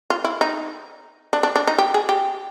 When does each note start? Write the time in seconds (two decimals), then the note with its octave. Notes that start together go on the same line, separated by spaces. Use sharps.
0.10 F4
0.24 E4
0.41 D#4
1.33 D4
1.43 D4
1.56 D4
1.67 D#4
1.78 G4
1.94 G#4
2.09 G4